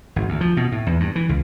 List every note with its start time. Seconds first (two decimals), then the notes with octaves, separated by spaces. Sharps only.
0.16 G#1
0.29 D2
0.41 F3
0.57 B2
0.72 A2
0.86 E2
1.00 G2
1.15 E3
1.29 C#2